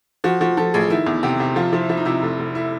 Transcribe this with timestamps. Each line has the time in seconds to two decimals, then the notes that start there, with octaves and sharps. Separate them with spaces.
0.24 F3 F#4
0.41 F3 F#4
0.57 F3 A4
0.74 A1 G#4
0.90 D#3 E4
1.06 E2
1.23 C3 G4
1.40 C3
1.56 F3 F4
1.73 F3 E4
1.89 F3 E4
1.97 D#4
2.05 C3 E4
2.22 F1
2.38 F1
2.55 E4